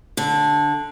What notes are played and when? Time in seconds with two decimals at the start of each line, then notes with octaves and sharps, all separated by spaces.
0.17 D3